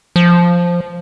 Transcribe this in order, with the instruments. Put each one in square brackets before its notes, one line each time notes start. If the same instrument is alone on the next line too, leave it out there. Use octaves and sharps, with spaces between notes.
[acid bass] F3